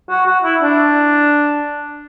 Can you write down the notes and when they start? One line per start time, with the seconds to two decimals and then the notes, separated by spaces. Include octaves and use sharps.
0.09 F#4
0.26 F#4
0.44 E4
0.62 D4